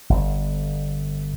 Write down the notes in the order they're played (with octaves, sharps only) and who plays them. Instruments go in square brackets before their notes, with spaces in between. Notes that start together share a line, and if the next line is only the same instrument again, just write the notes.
[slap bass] G1